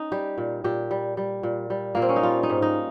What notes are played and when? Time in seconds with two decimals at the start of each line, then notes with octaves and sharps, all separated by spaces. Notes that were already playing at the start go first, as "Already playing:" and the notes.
Already playing: C#4 D#4
0.12 G3 G4
0.38 A#2
0.64 A#2 G4
0.91 G3
1.17 G3
1.43 A#2
1.70 G3
1.95 A#2 A#3
2.02 C4
2.09 C#4
2.16 D#4
2.23 G3 F4
2.43 D#4
2.49 G#2
2.62 D#4